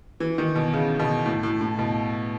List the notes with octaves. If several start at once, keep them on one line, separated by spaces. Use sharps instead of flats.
E3
D#3
B2
C#3
B2
A2
A2
A2
B2